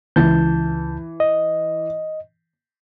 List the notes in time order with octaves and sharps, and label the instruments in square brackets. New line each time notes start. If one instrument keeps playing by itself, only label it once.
[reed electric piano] C#2 A5 G6 [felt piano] E3
[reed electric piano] D#5